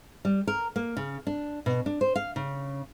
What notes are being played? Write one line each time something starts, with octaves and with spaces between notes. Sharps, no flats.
G3
A#4
A#3
C#3
D4
B2
D4
C5
F5
C#3